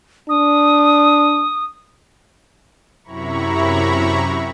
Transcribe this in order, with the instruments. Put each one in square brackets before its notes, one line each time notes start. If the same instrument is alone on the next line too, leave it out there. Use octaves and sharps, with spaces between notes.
[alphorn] D4 [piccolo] D#6
[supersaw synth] F#2 C3 E4 A#5 B5 C#6